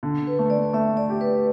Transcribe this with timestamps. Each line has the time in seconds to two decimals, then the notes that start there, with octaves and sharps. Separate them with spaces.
0.03 D3
0.27 B4
0.39 A3
0.50 D5
0.73 A3 E5
0.97 D5
1.09 G4
1.21 B4